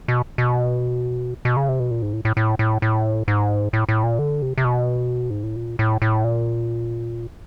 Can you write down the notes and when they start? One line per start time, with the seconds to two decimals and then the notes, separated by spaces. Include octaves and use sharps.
0.08 B2
0.38 B2
1.45 B2
1.57 C#3
1.69 C3
1.80 B2
1.91 A#2
2.02 G#2
2.13 A2
2.25 A2
2.37 A2
2.59 A2
2.82 A2
3.28 G#2
3.73 A2
3.89 A2
4.04 A#2
4.19 D3
4.42 C3
4.58 C3
4.65 B2
5.30 G#2
5.43 A2
5.56 A#2
5.79 A2
6.02 A2
6.24 A#2